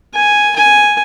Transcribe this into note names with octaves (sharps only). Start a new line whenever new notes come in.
G#5
G#5